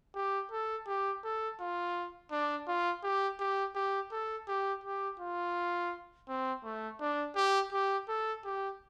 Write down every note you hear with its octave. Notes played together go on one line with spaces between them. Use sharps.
G4
A4
G4
A4
F4
D4
F4
G4
G4
G4
A4
G4
G4
F4
C4
A3
D4
G4
G4
A4
G4